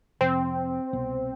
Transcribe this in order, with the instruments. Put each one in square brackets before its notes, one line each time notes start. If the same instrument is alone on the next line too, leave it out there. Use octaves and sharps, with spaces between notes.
[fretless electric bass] F2 C3 F3 [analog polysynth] C4
[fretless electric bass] C2 B2 B3